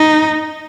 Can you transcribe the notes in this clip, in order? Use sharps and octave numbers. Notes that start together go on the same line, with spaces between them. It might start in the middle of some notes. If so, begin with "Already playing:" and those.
Already playing: D#4